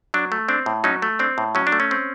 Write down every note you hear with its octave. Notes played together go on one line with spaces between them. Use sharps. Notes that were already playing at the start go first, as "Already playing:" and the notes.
F#3 D4
A3
C4 D4
A2
F#3 C#4 D#4
A3
C4 D4
A2
F#3 C#4
D4
A3
C#4
C4